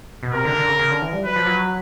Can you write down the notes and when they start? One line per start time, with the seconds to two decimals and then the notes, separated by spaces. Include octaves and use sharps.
0.23 B2
0.33 C3 A#4
0.45 D3
0.56 D3
0.68 C#3
0.79 C#3
0.91 D3
1.02 E3
1.13 G3
1.25 F#3 B4
1.36 F3
1.47 F#3